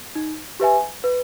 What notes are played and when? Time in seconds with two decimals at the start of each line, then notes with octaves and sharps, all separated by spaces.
0.15 D#4
0.60 G4 B4 E5 G#5
1.04 B4